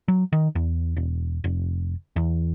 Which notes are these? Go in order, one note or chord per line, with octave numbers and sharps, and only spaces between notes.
F#3
D#3
E2
E1
F1
E2